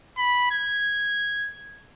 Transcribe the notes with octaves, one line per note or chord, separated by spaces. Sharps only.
B5
G#6